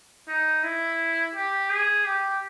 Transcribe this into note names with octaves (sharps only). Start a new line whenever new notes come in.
D#4
E4
G4
G#4
G4